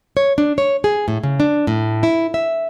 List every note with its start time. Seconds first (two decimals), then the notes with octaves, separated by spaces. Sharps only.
0.17 C#5
0.38 D4
0.58 C#5
0.84 G#4
1.08 A2
1.23 C#3
1.40 D4
1.67 A2
2.03 E4
2.34 E5